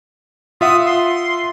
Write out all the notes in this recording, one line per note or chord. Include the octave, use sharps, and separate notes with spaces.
F4 E5 F#5 D#6
C6